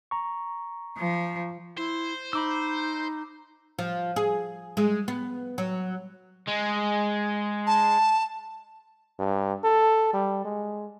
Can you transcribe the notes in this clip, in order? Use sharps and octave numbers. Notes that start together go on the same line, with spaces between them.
A#5 C#6
F3
E4 C5
D#4 B5 D6 E6
F3
G#4
G#3
B3
F#3
G#3
A5
G2
A4
G3
G#3